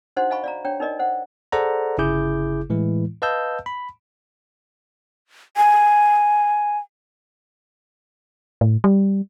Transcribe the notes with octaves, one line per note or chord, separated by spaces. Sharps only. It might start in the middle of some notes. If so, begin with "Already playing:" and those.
D4 D#4 F#4 C5 F#5 C6
D#5 F5 G#5 B5 C#6
D5 F5 A#5
D4 C#5 G5 A#5
D#4 A#4 D5 D#5
C5 F#5
G#4 A4 C5 D5 F#5 A#5
G1 C#3 E4 G#4 D6 G6
A2 E3 G#3 E4
B4 D#5 F5 A5 E6 G6
B5
G#5
A2
G3